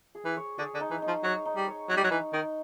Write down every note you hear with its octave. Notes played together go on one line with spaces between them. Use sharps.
G#4
E3
C#5
D3 G#4
D3
D#4
E3
D#4
F3
F#3 C#5
D#4
G3
C#5
F#3 D#4
G3
F#3
E3 D#4
D#3 D#4